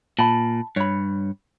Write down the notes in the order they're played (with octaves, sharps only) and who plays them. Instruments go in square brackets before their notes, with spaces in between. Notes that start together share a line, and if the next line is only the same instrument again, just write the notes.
[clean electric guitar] A#2 [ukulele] A5 B5
[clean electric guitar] G2 [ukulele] C#5 B5